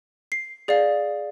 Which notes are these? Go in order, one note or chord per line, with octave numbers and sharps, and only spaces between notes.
C7
G#4 D5 F5